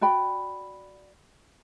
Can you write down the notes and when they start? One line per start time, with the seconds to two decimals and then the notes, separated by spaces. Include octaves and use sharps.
0.01 F#4 D5 G5 B5